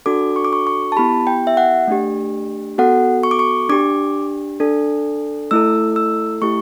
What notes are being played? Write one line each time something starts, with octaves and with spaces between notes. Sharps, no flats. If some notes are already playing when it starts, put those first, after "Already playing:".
D4 F#4 A4 D6
C#6
D6
C#6
C#6
A5
B3 E4 G4 B5
G5
E5
F#5
A3 D4 G4
B3 F#4 A4 F#5
C#6
D6
C#6
D4 G4 D6
D4 A4
A3 E4 A4 E6
E6
A3 E4 G4 C#6